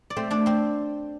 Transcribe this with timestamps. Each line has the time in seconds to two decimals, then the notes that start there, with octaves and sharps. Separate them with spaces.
0.10 D5
0.16 A3 C4 C5
0.31 D4 D5
0.46 C4 C5